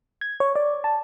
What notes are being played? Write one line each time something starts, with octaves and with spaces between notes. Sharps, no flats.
G#6
C#5
D5
A5